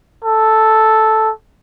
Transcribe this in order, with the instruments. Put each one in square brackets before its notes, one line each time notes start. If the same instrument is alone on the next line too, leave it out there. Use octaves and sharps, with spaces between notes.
[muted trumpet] A4